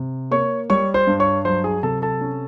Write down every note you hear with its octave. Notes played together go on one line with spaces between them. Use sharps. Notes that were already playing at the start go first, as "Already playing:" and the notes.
Already playing: C3
A#3 C#5 C#6
G3 C#5 C#6
C5 C6
G2
C#5 C#6
F#3 C5 C6
G#4 G#5
C3 A4 A5
A4 A5
C#4